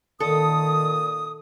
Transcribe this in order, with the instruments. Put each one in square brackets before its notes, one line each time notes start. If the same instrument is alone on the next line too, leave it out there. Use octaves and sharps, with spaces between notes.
[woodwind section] A#2 D#6 [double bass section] D#3 [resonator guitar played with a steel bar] A4